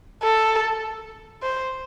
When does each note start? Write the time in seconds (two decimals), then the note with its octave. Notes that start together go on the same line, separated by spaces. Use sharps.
0.23 A4
1.43 C5